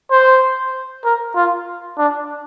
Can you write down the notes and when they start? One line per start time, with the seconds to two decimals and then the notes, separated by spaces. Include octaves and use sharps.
0.11 C5
1.05 A#4
1.36 F4
1.98 D4